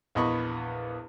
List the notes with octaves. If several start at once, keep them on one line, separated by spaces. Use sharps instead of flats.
A#1 E2 B3 D#5 B5 C#6